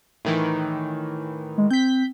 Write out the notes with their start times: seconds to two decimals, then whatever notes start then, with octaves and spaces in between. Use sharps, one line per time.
0.25 A2 D#3 E3
1.58 G#3
1.71 C4 G6 B6